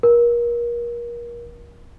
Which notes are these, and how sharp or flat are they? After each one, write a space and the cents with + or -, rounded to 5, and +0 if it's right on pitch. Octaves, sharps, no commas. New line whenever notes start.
A#4 +30